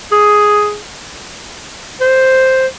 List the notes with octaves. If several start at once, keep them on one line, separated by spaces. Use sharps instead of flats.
G#4
C5